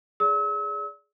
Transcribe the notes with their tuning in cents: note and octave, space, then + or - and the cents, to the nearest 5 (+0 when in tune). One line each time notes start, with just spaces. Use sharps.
G#4 +0 D5 -25 E6 -40